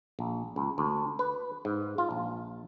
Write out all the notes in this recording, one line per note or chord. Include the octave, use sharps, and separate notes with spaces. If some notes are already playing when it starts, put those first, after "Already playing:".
A#1
C#2
D2
B4
G#2
F4
A#1